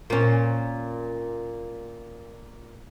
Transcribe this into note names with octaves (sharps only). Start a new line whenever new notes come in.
A#2 C#4